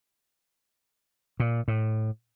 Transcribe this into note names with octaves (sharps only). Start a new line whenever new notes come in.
A#2
A2